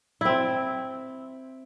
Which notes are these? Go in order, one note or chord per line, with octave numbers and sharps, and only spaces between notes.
C4 E4